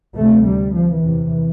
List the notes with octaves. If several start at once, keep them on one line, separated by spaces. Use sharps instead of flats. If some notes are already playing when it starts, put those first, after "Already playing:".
D2 C3 A3
G3
F3
E2 C3 E3